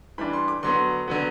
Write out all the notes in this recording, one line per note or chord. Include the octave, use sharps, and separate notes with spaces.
E3 G3 D4 B5
C6
D6
D3 F#3 B3 C6
D3 F#3 B3